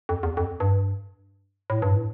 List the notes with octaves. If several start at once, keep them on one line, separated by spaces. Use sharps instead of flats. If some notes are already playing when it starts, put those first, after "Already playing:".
F2
E2
F2
G2
A2
G2
A2